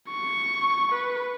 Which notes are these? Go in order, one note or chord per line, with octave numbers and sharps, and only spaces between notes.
C#6
B4